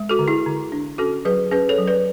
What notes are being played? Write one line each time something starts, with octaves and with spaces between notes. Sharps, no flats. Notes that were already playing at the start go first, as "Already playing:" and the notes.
Already playing: G#3
F#4 A4
D3
E4 G#4
D3
D4
C#4 F#4 A4
F#3 G#4 B4
C#4 G#4 B4
A4 C#5
F#3
B4 D5